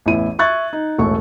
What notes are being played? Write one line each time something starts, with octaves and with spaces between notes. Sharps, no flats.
A1 E2 E4 D#7
E5 C#6 F#6 G#6 A6
D#4
E1 A1 A3 C#6